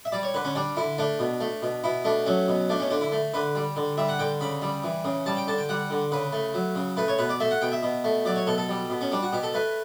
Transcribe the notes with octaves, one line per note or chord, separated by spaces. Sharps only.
E5
G3 D5
C#5
D3 B4
C#4
G3 D4
D3 E4
A3 D4
B2
A3
B2
B2 E4
A3 D4
F#3 C#4
B2
A3 D4
C#4
D3 D4
E4
A3
D3 B4
G3
D3
G3 E5
F#5
D3 G5
C#3 B5
G3
E3
C#3
G3 A5
G5
D3 A5
G5
G3 F#5
D3
C#3 B4
A3
F#3
C#3
A3 B4
C#5
B2 B4
D5
A3 E5
F#5
B2 G5
E5
B2
A3
F#3 D5
C#5
B2 A4
A4
G3
B2
C#4
G3 D4
F#4
B2 G4
A4
A3 B4